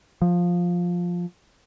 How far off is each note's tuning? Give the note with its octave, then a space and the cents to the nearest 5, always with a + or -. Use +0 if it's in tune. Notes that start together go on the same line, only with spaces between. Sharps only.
F3 +10